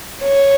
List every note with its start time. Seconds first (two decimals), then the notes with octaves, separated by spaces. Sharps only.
0.23 C#5